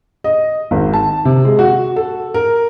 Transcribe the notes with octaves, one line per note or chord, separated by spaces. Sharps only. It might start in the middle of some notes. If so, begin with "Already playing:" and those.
D#5
G#1
A5
C3
G#3
F#4
A4
A#4